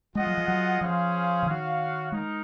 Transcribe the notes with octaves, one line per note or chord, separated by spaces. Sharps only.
G#3 F4 G#4 D#5 F#5
F#3
F3
F#3
F3 C#4 G#4 C5 F5
C#3
D#3 F#4 C#5 F5
G#3 D#4 A#4